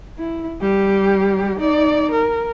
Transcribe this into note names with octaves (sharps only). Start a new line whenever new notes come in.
E4
G3 G4
D#4 D5
A#4